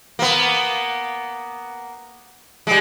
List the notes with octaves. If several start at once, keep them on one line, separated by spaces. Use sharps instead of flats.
A#3 B3
G3 G#3